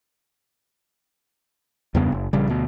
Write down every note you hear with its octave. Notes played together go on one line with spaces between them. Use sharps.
E2 G2 C#3 B3
F#1
A#1 C#3 G3
D2 B2